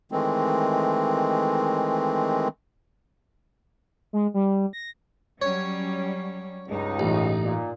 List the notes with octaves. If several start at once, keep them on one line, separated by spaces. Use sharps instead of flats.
D#3 E3 G#3 A3 C4
G#3
G3
A#6
F#3 G3 C#4 C#5
C#2 G2 D#4
A1
A#2